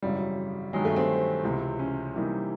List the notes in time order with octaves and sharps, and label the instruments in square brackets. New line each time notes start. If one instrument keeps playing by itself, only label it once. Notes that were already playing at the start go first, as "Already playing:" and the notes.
[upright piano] G#1 F#2 C#3 E3 [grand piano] G3
[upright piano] G2 D#3 F#3 [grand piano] G#3
[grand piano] A3
C4
[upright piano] C#2 C3 E3
[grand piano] C#4
[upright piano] C3 E3 G3 A#3 D#4